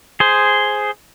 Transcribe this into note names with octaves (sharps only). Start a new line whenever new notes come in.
G#4 C5